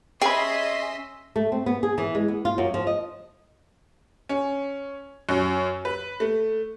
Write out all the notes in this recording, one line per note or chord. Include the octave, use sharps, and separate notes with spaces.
C#4 G#4 D#5 E5 G5 B5 C6 B6
A3
C4
B3
G#4
E3
G#3
B3
F4
F#2
F3
D#5
C#4
F#2
B4
A3